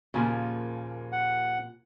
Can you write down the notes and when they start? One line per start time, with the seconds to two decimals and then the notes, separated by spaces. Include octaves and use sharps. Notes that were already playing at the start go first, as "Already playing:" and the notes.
0.14 D#2 A#2 C#3 F3 A#3 F4 G#5
1.12 F#5